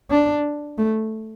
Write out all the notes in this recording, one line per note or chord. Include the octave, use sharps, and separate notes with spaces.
D4
A3